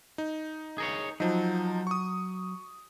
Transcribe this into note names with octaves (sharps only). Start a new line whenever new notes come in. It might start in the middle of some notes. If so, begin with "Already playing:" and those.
D#4
G#4 A#4 C#5
F3 F#3 D#4
C#6 D#6